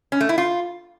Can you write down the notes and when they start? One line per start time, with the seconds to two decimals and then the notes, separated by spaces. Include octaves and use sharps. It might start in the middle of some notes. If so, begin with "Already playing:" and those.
0.12 C#4
0.21 A3
0.29 E4
0.38 F4